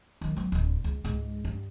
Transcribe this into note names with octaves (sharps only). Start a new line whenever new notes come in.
D#3 F#3
F#3 B3
D1 D3
C#2
C#2 G#2
G2